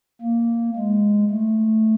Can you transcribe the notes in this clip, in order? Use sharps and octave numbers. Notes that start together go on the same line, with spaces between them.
A#3
G#3
A3